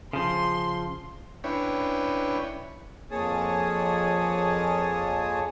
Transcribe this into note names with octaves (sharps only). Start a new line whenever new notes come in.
C#3 F3 C6
C#4 D4 E4 B4 C#5 G5
F2 A#3 G#4 C#5 A5 D#6